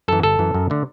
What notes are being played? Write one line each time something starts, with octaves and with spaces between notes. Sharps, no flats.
F#2 E3 A4
G1 A4
F#2 E3
F#2
D3 A3